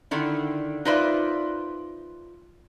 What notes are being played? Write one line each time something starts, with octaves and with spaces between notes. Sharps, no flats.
D3 D#3 E4
D#4 F4 B4 C5 D5 E5